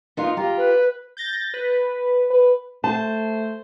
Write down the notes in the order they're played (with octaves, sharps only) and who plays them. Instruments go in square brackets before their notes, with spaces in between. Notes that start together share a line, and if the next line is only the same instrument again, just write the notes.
[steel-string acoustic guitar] B3 D#4 F4
[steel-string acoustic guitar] F4 G4 [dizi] A#5
[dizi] B4
[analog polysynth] G6 A6 A#6
B4
[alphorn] B4
[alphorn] A3 [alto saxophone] C5 [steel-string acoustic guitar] A5